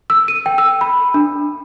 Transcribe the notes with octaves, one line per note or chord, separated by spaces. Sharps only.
E6
D#7
G5
E6
B5
D4